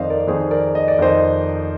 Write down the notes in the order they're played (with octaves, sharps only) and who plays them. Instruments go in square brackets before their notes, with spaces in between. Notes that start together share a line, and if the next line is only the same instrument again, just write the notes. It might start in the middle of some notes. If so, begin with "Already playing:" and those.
Already playing: [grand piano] F2 D#3 C5 D5 D#5 F5
A#4 D5
F2 D#3 G#4 C5
A#4 D5
D#5
D5
F2 D#3 C5 D#5